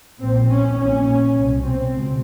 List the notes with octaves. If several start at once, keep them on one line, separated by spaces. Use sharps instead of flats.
A#1 A#2 C4
C#4
A#1 A#2 C#4
C2 B2
C4
C#2 B2